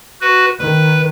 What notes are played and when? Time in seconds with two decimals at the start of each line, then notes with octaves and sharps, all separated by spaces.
0.21 F#4 B4
0.59 D#3 B4